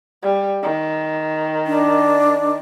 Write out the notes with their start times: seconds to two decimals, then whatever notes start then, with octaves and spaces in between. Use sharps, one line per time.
0.23 G3
0.63 D#3
1.67 D4